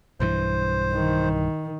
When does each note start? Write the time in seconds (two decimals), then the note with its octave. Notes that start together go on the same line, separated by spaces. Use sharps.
0.20 B1 G2 E3 C5
0.94 D#3